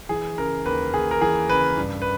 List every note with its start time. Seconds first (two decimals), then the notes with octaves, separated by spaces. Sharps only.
0.09 E3 G#4
0.38 C#3 A#4
0.65 D#2 B4
0.93 D#2 G#4
1.11 A#4
1.21 E3 G#4
1.49 C#3 B4
1.77 G2
2.02 B4